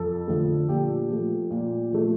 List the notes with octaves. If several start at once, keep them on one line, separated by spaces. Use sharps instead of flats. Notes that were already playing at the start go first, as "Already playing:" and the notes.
Already playing: F2 A4
D3 F3 A3
A#2 G4
F3 A3
A#2
F3 A3